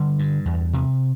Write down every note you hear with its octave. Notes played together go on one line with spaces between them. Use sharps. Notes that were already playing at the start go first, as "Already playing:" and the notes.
Already playing: D3 G3
G2
E2
C3